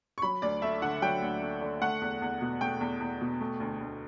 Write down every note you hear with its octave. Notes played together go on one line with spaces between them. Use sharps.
C#6
F#3 B5
D2 D5
A3 E5
D3 F#5
F#3 G5
D2
A3
D3
A3 F#5
E2
E2
B2
A3 G5
E2
E2
B2
A3
D2
D2